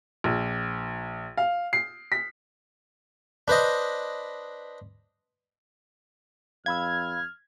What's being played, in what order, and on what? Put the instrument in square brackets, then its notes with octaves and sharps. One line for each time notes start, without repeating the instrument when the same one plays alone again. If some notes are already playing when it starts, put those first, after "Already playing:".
[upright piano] A#1
F5
C7
B6
[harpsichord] D4 B4 C5 D#5
[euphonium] F2 [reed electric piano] F5 B5 E6 [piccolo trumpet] F6 [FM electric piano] G#6